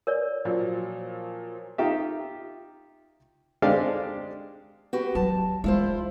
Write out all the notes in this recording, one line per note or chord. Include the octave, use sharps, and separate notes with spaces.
A#4 C#5 D5
A#2 F3 F#3
D#4 F4 G4 E5
G#3 C4 D4 G4 D5 F5
F#4 G4 B4
F#3 A5
G#3 E4 F4 C5